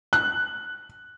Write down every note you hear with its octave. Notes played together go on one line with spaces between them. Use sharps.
F#6